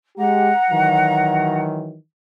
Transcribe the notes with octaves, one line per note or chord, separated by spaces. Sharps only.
G#3 G4 F#5 A#5
D#3 E3 F#3